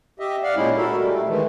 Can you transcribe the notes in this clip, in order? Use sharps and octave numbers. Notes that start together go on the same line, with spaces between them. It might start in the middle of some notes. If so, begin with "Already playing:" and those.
G4 D#5 E5
D5 F5 F#5
A#2 G#3 C#4 D#4 E4
F#4 A4 A#4 E5
G3 A3
D#3 E3 G#3 A3